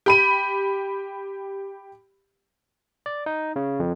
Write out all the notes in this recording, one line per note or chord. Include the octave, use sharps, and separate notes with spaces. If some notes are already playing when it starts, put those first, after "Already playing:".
G4 B5 D#7
D5
D#4
C#3
F2